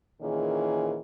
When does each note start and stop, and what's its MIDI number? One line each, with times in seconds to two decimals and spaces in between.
0.21 1.00 46
0.21 1.00 51
0.21 1.00 52
0.21 1.00 61
0.21 1.00 68